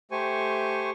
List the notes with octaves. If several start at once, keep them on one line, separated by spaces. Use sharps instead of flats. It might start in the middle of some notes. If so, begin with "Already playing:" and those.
A3 G4 C5 G#5 C#6